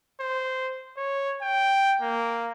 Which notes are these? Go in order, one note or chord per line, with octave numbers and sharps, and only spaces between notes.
C5
C#5
G5
A#3